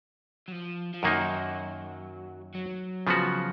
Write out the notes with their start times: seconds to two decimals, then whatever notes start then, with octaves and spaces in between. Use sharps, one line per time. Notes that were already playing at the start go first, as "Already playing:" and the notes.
0.48 F#3
0.52 F3
0.94 F3
1.03 F#2 D#3 F#3 A#3 D#4
2.55 F#3
3.07 C#3 F3 B3 F#4